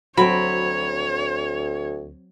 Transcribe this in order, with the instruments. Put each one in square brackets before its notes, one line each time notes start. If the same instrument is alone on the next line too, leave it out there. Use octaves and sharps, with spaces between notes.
[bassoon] D2 [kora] F#3 C4 [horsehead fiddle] C#5 [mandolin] B5